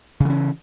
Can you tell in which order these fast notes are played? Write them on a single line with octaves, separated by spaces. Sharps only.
C#3 E3 C#4